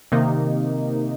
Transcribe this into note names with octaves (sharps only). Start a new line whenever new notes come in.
C3 D#3 A#3 D#4